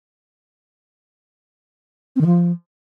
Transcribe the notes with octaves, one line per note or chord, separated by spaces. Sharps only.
C4
D#3
F3